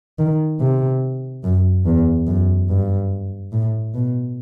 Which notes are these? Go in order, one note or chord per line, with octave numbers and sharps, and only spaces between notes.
D#3
C3
F#2
E2
F#2
G2
A2
B2